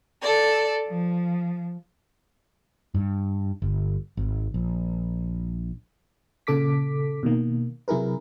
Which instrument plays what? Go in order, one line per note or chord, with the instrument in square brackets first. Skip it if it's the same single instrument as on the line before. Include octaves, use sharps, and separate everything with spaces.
[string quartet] A4 D5
F3
[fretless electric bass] G2
G1
G#1
A#1
[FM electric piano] A#2 C#3 A4 D6 B6
B2 D#3 A#3
C3 F#3 E4 G#4 A#4 B4